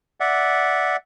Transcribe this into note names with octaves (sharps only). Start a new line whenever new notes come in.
D5 E5 F#5